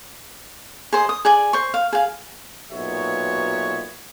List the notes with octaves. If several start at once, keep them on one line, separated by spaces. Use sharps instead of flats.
G#4 C5 D#5 D#6
D#6
G#4 D5 G#5
C5 C#6
F5
G#4 F5
B1 A#2 B3 F#4 C#5 E5